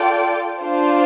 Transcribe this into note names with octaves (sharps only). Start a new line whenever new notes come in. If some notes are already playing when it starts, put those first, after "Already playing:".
Already playing: F4 A4 D5 G5
D4 F4 C5